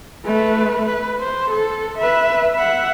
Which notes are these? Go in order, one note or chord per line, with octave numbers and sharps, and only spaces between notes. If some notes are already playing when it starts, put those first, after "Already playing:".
A3 B4
B4
C5
A4
B4 E5
E5 F#5